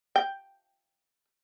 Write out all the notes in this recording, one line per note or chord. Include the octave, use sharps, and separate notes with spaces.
G5